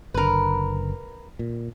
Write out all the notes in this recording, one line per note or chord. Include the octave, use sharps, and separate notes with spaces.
F#1 D3 A#4 B4
A#2